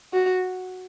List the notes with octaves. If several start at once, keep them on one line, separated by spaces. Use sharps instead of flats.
F#4